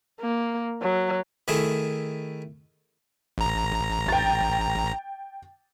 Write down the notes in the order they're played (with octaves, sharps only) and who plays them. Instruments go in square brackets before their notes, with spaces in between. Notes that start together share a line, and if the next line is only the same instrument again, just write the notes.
[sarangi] A#3
F#3
[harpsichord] D#3 A3 E4 G#4
[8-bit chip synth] A1 A#5
[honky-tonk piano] G5 A6